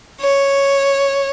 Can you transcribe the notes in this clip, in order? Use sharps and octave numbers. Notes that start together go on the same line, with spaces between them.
C#5